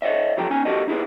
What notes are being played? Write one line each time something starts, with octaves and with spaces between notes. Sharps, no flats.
A4 C#5 D#5 E5
C#2 F3 F#3 G4 A4 A#5
C#4 D#4 G#5
F#4 G4 A4 A#4 D#5
D#4 E4 G#4 B4